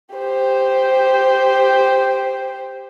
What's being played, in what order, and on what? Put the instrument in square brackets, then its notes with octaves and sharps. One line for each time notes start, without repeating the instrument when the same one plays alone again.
[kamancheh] G4 C5